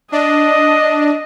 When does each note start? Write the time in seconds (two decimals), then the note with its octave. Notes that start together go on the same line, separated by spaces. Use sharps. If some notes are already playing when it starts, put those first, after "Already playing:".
0.12 D4 D#5